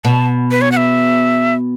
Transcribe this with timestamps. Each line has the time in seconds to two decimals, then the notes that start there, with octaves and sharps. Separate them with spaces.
0.04 B2 A5
0.51 B4
0.61 C#5
0.72 F#5
0.77 E5